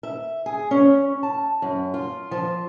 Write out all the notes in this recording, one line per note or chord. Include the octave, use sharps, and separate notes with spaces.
E5
G#4
C#4
A5
F#2
F4
F3